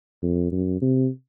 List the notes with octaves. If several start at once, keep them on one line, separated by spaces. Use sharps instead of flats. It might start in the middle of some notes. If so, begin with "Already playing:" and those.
F2
F#2
C3